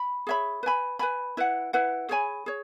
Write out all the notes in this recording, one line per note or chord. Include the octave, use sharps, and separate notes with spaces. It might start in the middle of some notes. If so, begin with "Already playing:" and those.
Already playing: B5
G#4 C#5 E5 B5
B4 G#5 B5
B4 G#5 B5
E4 B4 F#5
E4 B4 F#5
G#4 C#5 G#5 B5
G#4 C#5